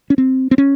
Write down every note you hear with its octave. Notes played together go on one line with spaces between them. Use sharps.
C#4
C4
C4
C#4